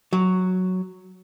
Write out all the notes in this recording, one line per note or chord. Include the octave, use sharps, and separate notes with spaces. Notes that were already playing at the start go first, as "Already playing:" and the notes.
F#3